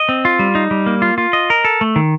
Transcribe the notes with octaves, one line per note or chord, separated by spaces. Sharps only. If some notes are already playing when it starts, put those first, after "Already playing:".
Already playing: D#5
C4
F4
G3
D#4
G3
A#3
F4
F4
D#5
A#4
A4
A3
D#3